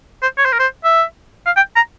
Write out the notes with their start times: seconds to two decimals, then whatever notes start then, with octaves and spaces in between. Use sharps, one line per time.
0.23 C5
0.38 C#5
0.45 C5
0.52 A#4
0.59 C5
0.85 E5
1.46 F5
1.57 G5
1.76 A#5